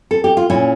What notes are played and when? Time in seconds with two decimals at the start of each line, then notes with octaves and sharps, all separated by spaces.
0.11 A4
0.24 G4
0.37 F4
0.50 A#2 C#4 E4